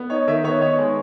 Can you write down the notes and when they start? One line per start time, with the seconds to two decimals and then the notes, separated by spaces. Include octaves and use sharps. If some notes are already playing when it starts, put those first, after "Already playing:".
Already playing: B3
0.10 D#4 C#5
0.27 D#3 E5
0.44 B3 C#5
0.61 D#4 C#5
0.78 G#3 C#5